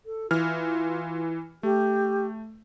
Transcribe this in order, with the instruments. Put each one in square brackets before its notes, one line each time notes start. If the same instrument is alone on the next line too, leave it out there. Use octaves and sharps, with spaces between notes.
[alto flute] A4
[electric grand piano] E3 F6 [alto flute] F4
[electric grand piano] A3 [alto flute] G4